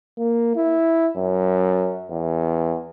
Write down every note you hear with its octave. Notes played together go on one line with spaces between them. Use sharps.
A#3
E4
F#2
E2